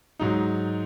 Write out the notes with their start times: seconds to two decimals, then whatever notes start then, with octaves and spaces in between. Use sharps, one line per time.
0.20 G#2 F#3 D#4